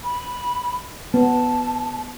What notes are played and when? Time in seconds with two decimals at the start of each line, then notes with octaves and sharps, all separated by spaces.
0.04 B5
1.14 B3 A5